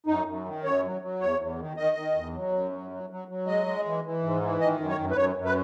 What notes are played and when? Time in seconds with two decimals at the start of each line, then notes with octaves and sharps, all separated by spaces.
0.06 F#2 D#4
0.26 F#2
0.45 D#3
0.63 F#2 C#5
0.83 F#3
1.01 F#3
1.20 E2 C#5
1.39 E2
1.58 D#3
1.77 D#3 D#5
1.96 D#3
2.15 E2
2.33 F#3
2.52 F#2
2.72 F#3
2.91 F#3
3.10 F#3
3.28 F#3
3.46 G#3 D#5
3.66 G#3
3.85 E3
4.04 E3
4.23 G#2
4.42 E3
4.60 D#3 D#5
4.79 F#2
4.88 C#5
4.98 F#2
5.11 B4
5.16 F#2 C#5
5.36 F#2
5.45 B4